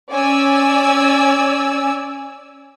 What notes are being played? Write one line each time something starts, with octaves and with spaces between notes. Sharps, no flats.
C#4 D5 G#5 E6